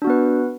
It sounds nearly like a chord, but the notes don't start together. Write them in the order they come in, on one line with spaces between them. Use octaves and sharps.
D4 F#4 B3 B4